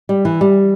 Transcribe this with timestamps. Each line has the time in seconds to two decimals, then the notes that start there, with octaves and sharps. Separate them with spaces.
0.09 G3
0.25 E3
0.41 G3